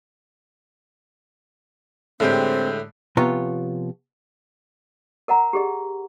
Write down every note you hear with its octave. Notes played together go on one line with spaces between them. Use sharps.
A2 D3 G#3 C4 G4
C3 F3 B3 F4 C#5 A#5
A#4 D#5 F#5 A#5
G4 G#4 D#5